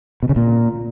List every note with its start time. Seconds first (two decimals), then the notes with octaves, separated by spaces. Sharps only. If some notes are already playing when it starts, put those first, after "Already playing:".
0.23 B2
0.29 C#3
0.36 A#2